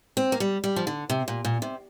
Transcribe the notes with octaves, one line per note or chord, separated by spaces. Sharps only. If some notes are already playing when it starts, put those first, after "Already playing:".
C4
A#3
G3
G3
F3
D3
C3
A#2
A#2
C3